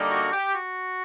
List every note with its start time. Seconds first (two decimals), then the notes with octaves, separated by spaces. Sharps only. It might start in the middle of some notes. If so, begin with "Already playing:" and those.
Already playing: D3 G3 A#3 D#4
0.11 F#4
0.32 G4
0.54 F#4